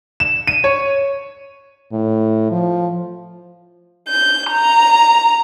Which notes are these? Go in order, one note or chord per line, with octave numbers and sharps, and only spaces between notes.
E7
D#7
C#5
A2
F3
G6
A#5